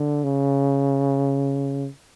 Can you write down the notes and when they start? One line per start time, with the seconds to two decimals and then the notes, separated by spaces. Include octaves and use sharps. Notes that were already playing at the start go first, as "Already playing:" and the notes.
Already playing: D3
0.24 C#3